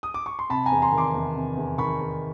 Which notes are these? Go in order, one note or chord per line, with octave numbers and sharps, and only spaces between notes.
D#6
D6
C#6
C6
C3 A5 B5
G#5 A#5
E2
A#5 C6
D#3
C6 D6
E2
C3
E2
D#3 B5 C#6
E2